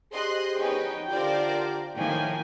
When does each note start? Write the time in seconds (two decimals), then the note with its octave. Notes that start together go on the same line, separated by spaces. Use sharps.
0.12 G4 G#4 C5 D#5 C6 F#6
0.58 B3 C#4 D#4 G5
1.09 D3 F4 G4 A#4 C5 D5
1.95 A2 D#3 F3 A#3 G5 G#5